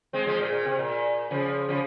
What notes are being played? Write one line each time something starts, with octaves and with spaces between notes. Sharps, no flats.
G#3 C4
F3 G#3
A#2
A#2
C3
A#2
C#3 F3
C#3 F3